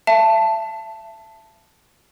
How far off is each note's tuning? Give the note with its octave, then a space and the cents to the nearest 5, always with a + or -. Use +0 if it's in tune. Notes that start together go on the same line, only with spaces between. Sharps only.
E5 +30 A5 +0